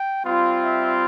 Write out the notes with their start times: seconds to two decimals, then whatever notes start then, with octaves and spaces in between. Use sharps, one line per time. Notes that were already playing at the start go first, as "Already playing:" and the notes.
Already playing: G5
0.25 G3 C4 F4
0.62 E5